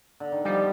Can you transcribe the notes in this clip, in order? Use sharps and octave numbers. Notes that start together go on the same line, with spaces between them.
D3
D#3
F3 G3